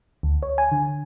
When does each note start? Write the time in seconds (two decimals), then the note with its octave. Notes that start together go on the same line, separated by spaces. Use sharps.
0.23 D2
0.43 C#5
0.58 G#5
0.72 D3